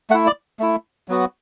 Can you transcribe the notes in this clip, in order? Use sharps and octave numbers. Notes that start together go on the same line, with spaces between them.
A3 E4 F#5
D5
A3 E4
F#3 B3 F#4